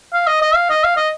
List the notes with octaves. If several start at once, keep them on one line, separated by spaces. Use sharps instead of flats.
F5
D#5
D#5
F5
D#5
F5
D#5